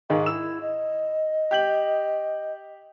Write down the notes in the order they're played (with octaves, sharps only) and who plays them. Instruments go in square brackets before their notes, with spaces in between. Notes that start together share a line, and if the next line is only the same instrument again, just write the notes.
[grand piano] G#2 D#3 G#3 [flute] F5
[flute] E4 [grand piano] E6 E7
[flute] D#5
[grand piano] G4 G6 F#7